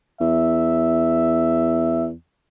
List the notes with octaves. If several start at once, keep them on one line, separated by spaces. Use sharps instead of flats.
E2 E5